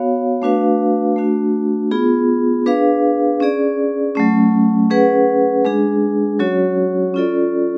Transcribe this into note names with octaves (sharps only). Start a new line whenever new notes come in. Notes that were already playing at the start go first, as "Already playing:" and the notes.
Already playing: B3 F#4 C#5 F5
A3 D4 F#4 B4 F5
A3 D4 F#4
B3 F4 G#4
D4 G#4 B4 F5
C#4 G#4 D5
F#3 A3 C#4
C#4 G#4 B4 F#5
G#3 D4 G#4
F#3 C#4 F#4 C#5
C#4 F4 A4 D5